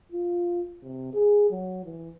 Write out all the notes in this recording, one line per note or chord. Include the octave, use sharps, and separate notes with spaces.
F4
C3
G#4
F#3
E3